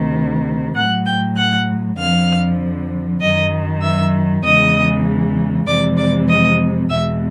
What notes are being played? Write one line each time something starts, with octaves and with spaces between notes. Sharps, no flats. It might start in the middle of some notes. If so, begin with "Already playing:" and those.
Already playing: D2 C3 D#3
A2 F#3 F#5 F#6
G5 G6
F#5 F#6
F2 D3 F3 F5 F6
F#2 D#3 F#3 D#5 D#6
E5 E6
E2 C#3 E3 G#3 D#5 D#6
F2 C3 E3 G#3 D5 D6
D5 D6
D#5 D#6
E2 B2 G#3 E5 E6